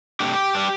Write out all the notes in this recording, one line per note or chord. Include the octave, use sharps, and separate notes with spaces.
C3 A3 D4 G4
G3 D4